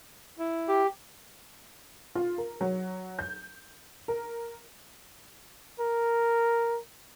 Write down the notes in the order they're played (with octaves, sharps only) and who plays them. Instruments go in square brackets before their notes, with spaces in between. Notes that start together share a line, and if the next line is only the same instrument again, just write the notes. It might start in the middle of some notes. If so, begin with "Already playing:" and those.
[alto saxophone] E4
[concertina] G4
[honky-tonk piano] F4
A#4
F#3
G6
A#4
[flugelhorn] A#4